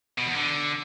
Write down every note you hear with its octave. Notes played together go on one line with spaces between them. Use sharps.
B2
E2
D3